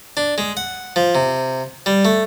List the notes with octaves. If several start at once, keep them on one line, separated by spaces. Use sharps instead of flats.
D4
G#3
F#5
F3
C3
G3
A3